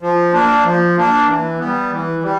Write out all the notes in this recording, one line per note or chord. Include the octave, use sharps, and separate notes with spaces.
F3
A#3 D4
F3
A#3 D4
E3
G3 B3
E3
G3